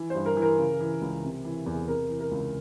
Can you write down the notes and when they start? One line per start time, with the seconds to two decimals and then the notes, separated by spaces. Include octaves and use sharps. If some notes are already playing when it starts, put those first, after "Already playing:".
Already playing: E3
0.10 C5
0.15 G2
0.26 A#4
0.37 E3
0.42 A#4
0.58 C#3
0.81 E3
1.02 C#2
1.24 C3
1.45 E3
1.66 E2
1.74 G#4
1.88 C3 A#4
2.09 E3
2.20 A#4
2.31 C#2